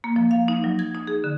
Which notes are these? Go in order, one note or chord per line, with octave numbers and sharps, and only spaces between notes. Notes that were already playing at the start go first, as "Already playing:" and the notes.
A#3
F3
F5
D#4
F#3
G#6
D#4
G#4
D3